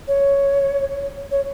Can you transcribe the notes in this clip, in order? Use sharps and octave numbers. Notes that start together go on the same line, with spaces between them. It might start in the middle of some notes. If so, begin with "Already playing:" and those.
C#5
C#5